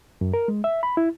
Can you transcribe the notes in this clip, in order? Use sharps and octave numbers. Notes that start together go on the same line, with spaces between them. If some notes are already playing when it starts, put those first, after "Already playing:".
F#2
A#4
G#3
E5
B5
E4